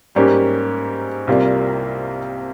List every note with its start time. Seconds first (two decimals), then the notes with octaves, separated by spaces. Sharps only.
0.15 G#2 G3 A#3 C#4 G4
1.27 C2 C3 G3 A#3 F4